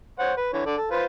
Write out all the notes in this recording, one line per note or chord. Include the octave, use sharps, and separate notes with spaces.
C5 C#5 F#5
B4
D3 E3 C#5
D3 A4 D5
A4
F4 B4 C5